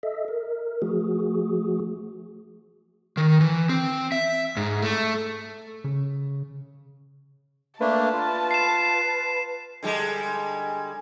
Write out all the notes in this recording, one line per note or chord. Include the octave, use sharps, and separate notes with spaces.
A4 D#5 E5
A#4
F3 A3 F#4 G#4
D#3
E3
C4
E5
G#2
A3
C#3
A3 A#3 D4 B4 A5
F4
C7 E7
D3 G3 G#3